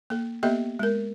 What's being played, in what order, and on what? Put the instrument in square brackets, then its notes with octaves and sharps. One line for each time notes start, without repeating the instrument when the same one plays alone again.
[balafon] A#3 A4
A#3 B3 G4 A4 D#5 E5
G#3 A#4